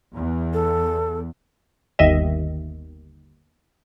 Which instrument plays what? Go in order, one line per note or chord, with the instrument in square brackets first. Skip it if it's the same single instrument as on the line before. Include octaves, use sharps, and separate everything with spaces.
[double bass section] E2
[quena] A4
[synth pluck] G1 D#2 D#3 D#5 E5